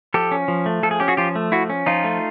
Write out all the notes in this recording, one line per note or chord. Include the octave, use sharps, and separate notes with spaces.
F3 G4 A4
C#4
F3
A3
F3 A4
G#4
C#4 G4
F#4 G#4
F3 F4 G4
A3
F3 E4 F#4
C#4
F3 D#4 F4
A3